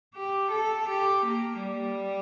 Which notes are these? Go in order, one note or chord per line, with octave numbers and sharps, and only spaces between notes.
G4
A4
G4
A#3
G3